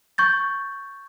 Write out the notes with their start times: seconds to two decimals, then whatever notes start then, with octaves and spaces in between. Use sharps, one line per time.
0.18 C#6 G6 A6